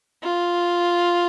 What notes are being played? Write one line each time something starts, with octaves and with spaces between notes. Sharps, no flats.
F4